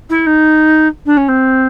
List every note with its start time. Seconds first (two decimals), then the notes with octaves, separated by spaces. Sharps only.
0.09 E4
0.26 D#4
1.06 D4
1.17 C#4
1.28 C4